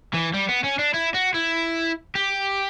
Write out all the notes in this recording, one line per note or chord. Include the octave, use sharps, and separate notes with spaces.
E3
G3
B3
C#4
D4
E4
F#4
E4
G4